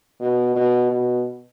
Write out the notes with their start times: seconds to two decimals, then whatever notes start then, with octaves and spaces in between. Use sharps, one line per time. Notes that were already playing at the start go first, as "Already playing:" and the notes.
0.20 B2
0.55 B2
0.90 B2